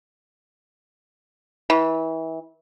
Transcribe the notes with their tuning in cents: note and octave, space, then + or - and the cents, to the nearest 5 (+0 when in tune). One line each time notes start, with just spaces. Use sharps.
E3 -30